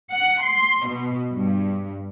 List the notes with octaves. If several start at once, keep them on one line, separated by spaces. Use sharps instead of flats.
F#5
C6
B2
G2